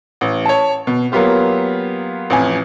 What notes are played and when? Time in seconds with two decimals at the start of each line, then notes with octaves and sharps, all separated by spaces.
0.21 A1
0.46 C#5 A5
0.87 B2
1.12 F#3 A#3 B3 F4 G4
2.30 A1 F2 G#5